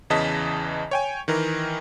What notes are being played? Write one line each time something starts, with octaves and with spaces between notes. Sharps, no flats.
E2 C#3 E3 D#5 A5 B6
C#5 G5 G#5
D#3 E3 A#4